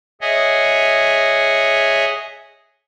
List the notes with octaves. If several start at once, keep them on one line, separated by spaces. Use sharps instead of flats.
G#4 C#5 D#5 E5 F#5 G#5